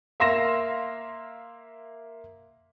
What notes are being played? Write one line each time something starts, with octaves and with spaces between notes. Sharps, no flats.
A#3 E5 F5 C6 A#6 E7